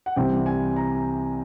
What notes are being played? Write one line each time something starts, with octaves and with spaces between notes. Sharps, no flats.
F#5
C2 C3 E3 G3 C4 G5
G#5
A#5